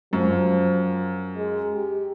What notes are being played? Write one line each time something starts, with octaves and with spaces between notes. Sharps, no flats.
F#2 F3
G#3
G4